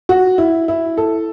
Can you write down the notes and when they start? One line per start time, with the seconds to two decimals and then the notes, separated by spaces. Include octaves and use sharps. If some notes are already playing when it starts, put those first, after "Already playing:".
0.09 F#4
0.38 E4
0.68 E4
0.97 A4